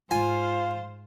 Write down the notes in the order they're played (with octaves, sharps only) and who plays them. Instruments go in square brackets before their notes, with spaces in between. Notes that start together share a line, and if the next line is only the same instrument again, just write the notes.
[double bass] G#2 [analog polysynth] F4 [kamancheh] C5 F5 [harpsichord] G#5